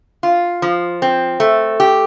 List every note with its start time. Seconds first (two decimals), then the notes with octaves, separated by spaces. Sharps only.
0.23 F4
0.62 F3
1.02 C4
1.40 A3
1.80 G4